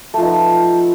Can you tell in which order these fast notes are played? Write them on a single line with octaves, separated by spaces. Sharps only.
A3 F3 D#4 B3